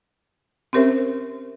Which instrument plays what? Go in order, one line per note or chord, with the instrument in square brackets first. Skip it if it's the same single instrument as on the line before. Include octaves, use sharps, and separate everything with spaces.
[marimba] C4 C#4 G4 A#4 C5 E5